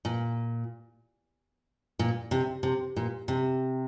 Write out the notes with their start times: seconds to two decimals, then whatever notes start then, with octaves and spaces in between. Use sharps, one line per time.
0.05 A#2
1.99 A#2
2.31 C3
2.63 C3
2.96 A#2
3.28 C3